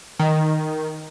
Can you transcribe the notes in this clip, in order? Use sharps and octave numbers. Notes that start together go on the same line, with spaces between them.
D#3